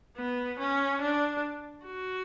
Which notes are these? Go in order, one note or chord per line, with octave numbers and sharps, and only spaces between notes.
B3
C#4
D4
F#4